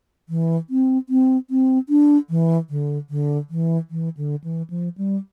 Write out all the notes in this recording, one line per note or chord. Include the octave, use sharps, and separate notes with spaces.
E3
C4
C4
C4
D4
E3
D3
D3
E3
E3
D3
E3
F3
G3